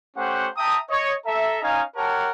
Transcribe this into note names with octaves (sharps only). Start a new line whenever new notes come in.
A3 C#4 G4 C5 F#5
E5 G5 A5 A#5 D#6
C#5 D#5
A4 E5 A#5
C#4 D#4 D#5 F5 G#5 A#5
G4 A#4 C#5 F#5 A5